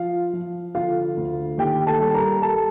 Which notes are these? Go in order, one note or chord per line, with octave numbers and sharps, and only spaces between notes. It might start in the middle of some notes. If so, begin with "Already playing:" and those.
Already playing: F3 F4 F5
F3
D3 F4 F5
D2
D#2 G4 G5
A4 A5
G3
A#4 A#5
G3 A4 A5